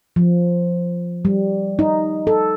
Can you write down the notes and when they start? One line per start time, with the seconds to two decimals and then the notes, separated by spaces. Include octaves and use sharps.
0.16 F3
1.25 G3
1.79 D#4
2.27 A4